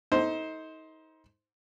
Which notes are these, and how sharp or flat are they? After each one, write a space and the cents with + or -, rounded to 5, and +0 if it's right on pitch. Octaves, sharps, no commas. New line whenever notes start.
D#4 +30 A4 +0 C5 +0